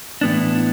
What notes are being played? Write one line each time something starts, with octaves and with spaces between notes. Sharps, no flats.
A2 E3 B3 D4